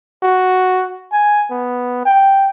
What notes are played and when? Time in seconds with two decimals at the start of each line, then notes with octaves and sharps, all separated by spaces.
0.23 F#4
1.12 G#5
1.51 B3
2.05 G5